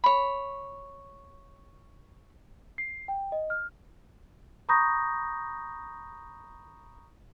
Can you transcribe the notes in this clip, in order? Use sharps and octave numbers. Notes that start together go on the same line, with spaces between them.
C#5 B5
C7
G5
D#5
F6
A#5 B5 C#6 D#6 G6 A#6